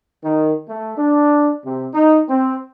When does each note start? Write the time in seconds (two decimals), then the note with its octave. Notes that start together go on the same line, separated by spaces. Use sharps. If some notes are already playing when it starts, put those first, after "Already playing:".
0.23 D#3
0.69 A3
0.98 D4
1.64 C3
1.94 D#4
2.29 C4